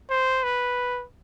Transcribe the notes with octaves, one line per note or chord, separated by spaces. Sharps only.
C5
B4